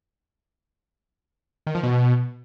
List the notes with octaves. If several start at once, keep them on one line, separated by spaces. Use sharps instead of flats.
D#3
F3
B2